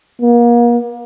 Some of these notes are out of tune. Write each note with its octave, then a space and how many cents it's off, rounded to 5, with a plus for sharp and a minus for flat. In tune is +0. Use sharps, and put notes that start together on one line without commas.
A#3 +35